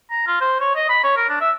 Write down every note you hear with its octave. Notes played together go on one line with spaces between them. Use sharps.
A#5
F4
C5
C#5
D#5
B5
C#5
A#4
D4
E5